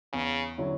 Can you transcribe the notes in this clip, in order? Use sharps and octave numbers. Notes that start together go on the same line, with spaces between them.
E2 C#3
D3 F#3 C#4 E4